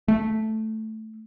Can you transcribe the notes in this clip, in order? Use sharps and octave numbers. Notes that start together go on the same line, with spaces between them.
A3